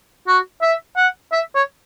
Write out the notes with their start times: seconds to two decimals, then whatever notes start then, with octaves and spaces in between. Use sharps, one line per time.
0.28 F#4
0.62 E5
0.97 F#5
1.32 E5
1.55 C#5